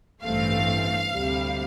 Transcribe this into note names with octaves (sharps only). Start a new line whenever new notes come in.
A1 G2 E3 A3 C4 F5
D2 C3 G3